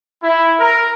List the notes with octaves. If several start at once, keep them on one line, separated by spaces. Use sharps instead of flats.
E4
A#4